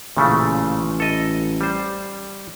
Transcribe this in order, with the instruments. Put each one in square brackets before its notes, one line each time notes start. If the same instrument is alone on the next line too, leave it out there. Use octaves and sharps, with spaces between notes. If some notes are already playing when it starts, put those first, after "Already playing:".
[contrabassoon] A1 [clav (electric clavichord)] A#2 C#3 A3
[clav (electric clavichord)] A4 D#5
G3 C5